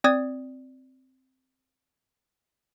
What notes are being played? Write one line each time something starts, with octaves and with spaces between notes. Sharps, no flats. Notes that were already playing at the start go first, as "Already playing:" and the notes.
C4 D5 D#6 G#6